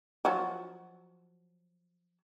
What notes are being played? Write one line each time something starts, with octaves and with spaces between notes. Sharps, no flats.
F3 F#3 F#4